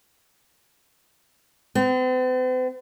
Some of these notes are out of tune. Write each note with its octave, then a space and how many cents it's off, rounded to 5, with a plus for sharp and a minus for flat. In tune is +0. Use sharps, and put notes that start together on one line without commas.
C4 -45